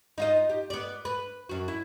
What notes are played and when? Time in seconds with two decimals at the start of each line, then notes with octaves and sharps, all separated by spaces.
0.18 D#4 F4 D#5
0.50 G4
0.70 B3 D5
1.05 B4
1.49 F#2 F#4
1.68 E4